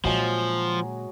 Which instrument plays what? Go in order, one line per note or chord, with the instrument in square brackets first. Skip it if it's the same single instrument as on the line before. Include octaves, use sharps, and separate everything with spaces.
[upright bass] A#2 D3 [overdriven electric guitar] F3 [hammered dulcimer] F#3 G#3 G#4